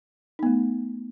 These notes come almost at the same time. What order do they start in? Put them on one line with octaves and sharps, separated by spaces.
D#4 B3 A3